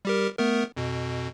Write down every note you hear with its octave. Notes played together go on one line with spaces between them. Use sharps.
G3 G4 A#4
A3 B3 A#4
F2 B2